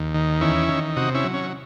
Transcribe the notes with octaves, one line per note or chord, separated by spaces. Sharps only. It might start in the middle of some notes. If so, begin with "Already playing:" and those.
Already playing: D#2
D#3
E2 C#4 E4
D#3
C3 D#4 F#4
C#4 E4
F#3
C#4